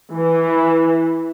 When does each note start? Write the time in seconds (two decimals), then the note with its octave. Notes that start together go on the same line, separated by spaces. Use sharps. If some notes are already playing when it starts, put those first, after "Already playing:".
0.14 E3